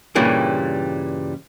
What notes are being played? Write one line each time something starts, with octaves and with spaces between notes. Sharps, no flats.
G2 A#2 C#3 E3 G3